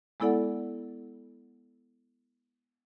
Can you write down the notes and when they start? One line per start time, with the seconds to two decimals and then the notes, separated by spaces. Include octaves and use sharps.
0.20 G#3 B3 E4 A4 D5 F#5